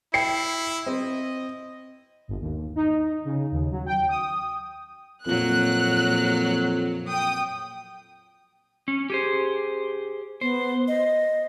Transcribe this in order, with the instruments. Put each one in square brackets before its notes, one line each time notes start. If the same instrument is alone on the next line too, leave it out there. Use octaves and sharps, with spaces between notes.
[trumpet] E4 [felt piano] G5 C7 C#7
[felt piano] C4 [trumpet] D#5
[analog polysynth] G1
D#2
D#4
C#3
D#2
F#3
G5
D#6
[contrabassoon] F2 [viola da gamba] A#2 F#3 [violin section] F#6
[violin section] G5 D#6
[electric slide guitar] C#4
G4 G#4 C5
[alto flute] B3 [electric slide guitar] C5
[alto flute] D#5